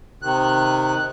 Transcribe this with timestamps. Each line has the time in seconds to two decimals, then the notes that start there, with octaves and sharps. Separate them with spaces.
0.22 C3 D#3 F#6